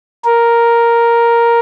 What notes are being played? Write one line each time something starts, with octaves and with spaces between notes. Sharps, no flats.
A#4